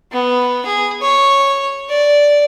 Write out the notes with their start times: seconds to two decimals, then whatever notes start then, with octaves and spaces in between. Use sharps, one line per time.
0.11 B3
0.66 G#4
1.02 C#5
1.89 D5